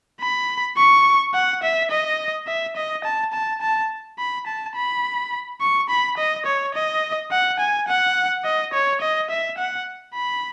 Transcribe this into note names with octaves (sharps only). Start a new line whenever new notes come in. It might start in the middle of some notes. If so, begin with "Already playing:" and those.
B5
C#6
F#5
E5
D#5
E5
D#5
A5
A5
A5
B5
A5
B5
C#6
B5
D#5
C#5
D#5
F#5
G#5
F#5
D#5
C#5
D#5
E5
F#5
B5